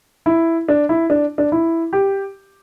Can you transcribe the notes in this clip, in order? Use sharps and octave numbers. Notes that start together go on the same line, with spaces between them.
E4
D4
E4
D4
D4
E4
G4